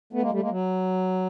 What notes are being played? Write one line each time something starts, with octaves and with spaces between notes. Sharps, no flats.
A3 B3
G#3 A#3
G3 A3
G#3 A#3
F#3